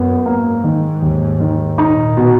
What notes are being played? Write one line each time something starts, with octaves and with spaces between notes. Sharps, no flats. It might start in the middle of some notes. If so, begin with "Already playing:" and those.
Already playing: F#2 B3
G#2 A#3
D#3
D#2
D#3
A#2 D#4
B2